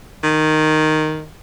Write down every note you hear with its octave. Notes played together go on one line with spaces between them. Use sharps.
D#3